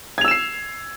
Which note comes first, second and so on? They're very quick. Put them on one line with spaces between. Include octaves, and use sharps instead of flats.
G#6 F7 E6 E7 C7